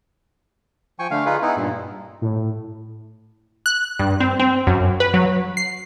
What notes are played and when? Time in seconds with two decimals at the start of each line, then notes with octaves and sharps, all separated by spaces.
0.99 F3 G5 G#5 C#6
1.11 D3 A3 F5
1.26 D#4 F4 G#4 B4
1.42 B3 D#4 E4
1.56 G2 A#2
2.21 A2
3.66 F#6
3.99 G2
4.20 C4
4.40 C4
4.67 F#2
5.00 B4
5.14 F#3
5.57 C7